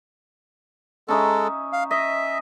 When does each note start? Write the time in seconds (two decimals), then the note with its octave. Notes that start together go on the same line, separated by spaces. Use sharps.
1.08 G#3 C#4 D#4 A4 E5
1.73 F5
1.91 D#5 E5